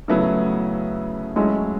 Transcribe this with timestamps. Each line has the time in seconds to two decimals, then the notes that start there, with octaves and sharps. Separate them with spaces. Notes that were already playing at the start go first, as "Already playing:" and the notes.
0.08 C#3 F#3 A3 B3 E4
1.36 F#3 G#3 A3 C#4 E4